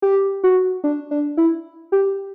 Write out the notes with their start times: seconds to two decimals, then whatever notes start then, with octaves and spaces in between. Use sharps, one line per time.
0.02 G4
0.44 F#4
0.84 D4
1.11 D4
1.37 E4
1.92 G4